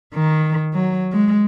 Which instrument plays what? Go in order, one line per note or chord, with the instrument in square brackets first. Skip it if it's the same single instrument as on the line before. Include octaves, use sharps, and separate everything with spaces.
[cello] D#3
F#3
G#3